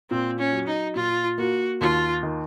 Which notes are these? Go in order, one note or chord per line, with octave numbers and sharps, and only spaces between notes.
A#2 C4
C#4
F#3
D#4
A#2 F4
A#3 F#4
D#2 F4
D#3